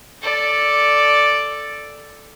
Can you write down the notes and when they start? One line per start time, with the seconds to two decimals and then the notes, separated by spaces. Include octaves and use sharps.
0.22 A4 D5